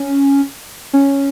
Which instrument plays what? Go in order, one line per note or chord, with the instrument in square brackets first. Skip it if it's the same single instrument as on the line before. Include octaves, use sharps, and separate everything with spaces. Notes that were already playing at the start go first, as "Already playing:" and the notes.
Already playing: [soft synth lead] C#4
C#4